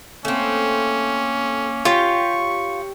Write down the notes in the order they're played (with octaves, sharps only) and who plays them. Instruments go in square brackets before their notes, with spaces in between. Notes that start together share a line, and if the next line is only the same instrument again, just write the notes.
[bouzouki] A3 C4 [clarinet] A#3 [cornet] C#4
[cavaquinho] F4 [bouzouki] G4 C#5 G5 [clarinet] C#6